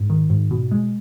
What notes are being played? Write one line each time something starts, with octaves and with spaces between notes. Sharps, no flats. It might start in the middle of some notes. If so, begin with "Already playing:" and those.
Already playing: G#2
D#3
G#2
B2
G#3